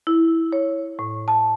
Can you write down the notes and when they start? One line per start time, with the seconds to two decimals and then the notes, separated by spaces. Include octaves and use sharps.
0.07 E4
0.52 C#5
0.99 A2
1.28 A5